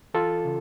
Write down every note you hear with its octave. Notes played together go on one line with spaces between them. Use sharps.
E3 F4 A4
C#3